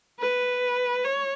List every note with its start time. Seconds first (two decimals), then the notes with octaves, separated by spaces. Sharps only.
0.20 B4
1.04 C#5